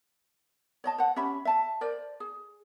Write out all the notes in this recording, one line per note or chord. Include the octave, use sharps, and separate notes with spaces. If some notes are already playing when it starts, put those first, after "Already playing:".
C#5 D#5 A5
C5 F#5
C#4 G4 E5 B5
E5 A5
A#4 C5 D5
G#4